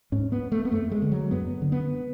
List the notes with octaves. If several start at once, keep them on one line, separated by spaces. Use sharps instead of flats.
G#2 C#4
B3
A3
B3
F#2 A3
G#3
D3
F#3
F#2 B3
D3
B3